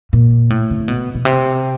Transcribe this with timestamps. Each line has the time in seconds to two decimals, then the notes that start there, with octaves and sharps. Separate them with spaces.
0.13 A#2
0.50 A2
0.71 C#3
0.79 C3
0.88 B2
1.15 B2
1.25 C3